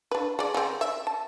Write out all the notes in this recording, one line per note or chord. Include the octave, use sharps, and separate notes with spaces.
D4 B4
G#3 D5
C#3 C4
E5
A5